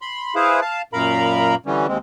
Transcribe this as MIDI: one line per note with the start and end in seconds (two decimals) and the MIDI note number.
0.02 0.35 83
0.02 0.35 84
0.35 0.60 64
0.35 0.60 68
0.35 0.60 71
0.35 0.60 72
0.35 0.60 77
0.61 0.82 77
0.61 0.82 81
0.93 1.55 42
0.93 1.55 46
0.93 1.55 70
0.93 1.55 77
0.93 1.55 82
0.93 1.55 83
1.66 1.87 50
1.66 1.87 52
1.66 1.87 55
1.66 1.87 61
1.88 1.98 39
1.88 1.98 56
1.88 1.98 60